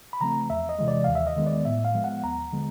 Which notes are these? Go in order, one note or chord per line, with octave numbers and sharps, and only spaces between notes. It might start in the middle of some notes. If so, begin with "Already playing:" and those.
B5
C#3 F3 A3 C4 A#5
E2 E5
D#5
C3 E3 G#3
D5
D#2 F5
E5
D#5
D#3 G#3 B3
D5
A2 E5
F5
F3 G#3 B3
F#5
D#2 A#5
D3 F3 G#3 B3